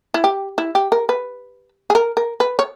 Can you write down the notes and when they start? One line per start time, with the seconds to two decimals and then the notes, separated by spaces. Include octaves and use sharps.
0.14 E4
0.24 G4
0.58 E4
0.75 G4
0.92 A#4
1.09 B4
1.90 G#4
1.95 A#4
2.17 A#4
2.40 B4
2.59 C#5